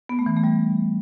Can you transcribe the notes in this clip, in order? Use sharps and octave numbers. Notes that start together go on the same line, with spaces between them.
B3
A3
E3
A3
G3